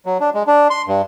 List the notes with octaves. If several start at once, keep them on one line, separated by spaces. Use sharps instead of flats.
F#3
D4
G#3
D4
C6
G2